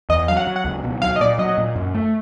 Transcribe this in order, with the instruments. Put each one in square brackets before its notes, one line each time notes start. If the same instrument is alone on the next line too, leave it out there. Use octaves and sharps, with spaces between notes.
[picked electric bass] E2 [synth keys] D#5
[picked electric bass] F#3 [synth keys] F5
[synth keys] F#5
[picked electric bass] F#3
[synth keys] F#5
[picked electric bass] C#2
B2
[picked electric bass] F#3 [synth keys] F5
[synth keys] D#5
[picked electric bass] A#2 [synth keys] D5
[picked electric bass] F#3 [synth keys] D#5
[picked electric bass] A#2
F#2
A3